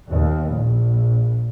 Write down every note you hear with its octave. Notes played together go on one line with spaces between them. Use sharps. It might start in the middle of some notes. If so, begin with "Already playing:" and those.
D#2
A#1